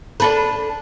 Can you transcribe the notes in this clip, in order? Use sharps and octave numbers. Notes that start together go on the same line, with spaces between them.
D4 A4 B4